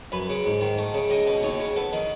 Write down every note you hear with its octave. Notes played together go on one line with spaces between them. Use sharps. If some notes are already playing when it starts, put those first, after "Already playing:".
F#2 B4
C#3
G#2
D#3
A3
C#3
C#2 D#5
B2
D#2 C#5
C#3
B3 A4
D#3